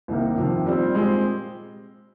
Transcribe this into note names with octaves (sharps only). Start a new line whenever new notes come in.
C2 C3 D#3 A#3 D#4
F2 C3 D#3
A#2 G3 C4
A#2 G#3 C4 G4